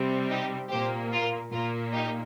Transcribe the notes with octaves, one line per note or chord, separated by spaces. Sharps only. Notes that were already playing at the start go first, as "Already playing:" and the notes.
Already playing: C3 G3 C4
D#4 G4
A#2 A#3 G4 C5
F4 A#4
A#2 A#3 F4 A#4
D#4 G4